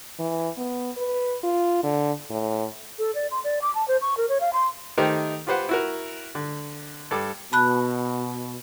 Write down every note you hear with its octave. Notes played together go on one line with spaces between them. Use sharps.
E3
B3
B4
F4
D3
A2
A4
D5
C6
D5
D6
A5
C5
C#6
A#4
C#5
F5
C6
D#3 A3 D#4 G4 A#4 C5
F4 G4 B4 C5 F#5
E4 F#4 A#4
D3
G2 A4 D6
B2 A5 B5 F#6